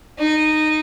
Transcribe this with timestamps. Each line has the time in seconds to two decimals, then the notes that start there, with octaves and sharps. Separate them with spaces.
0.19 D#4